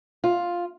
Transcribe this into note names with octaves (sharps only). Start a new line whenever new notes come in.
F4